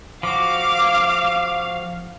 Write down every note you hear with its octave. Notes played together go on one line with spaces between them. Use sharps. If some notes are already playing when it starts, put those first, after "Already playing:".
F3 F#4 F5 D6